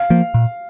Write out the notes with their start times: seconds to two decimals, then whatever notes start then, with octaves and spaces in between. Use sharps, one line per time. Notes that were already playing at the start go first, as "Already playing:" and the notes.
Already playing: F5
0.10 F3 A#3
0.34 A#2